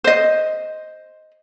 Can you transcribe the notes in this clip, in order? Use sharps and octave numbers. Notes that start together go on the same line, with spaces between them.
C5 D#5